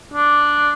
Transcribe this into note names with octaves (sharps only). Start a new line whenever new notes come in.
D4